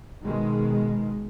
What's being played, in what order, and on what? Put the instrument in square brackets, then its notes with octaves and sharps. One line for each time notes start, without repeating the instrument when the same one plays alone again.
[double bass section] B2 D#3 G#3